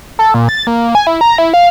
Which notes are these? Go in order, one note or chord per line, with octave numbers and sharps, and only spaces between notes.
A4
A#2
A6
A#3
G#5
E4
A#5
E4
F5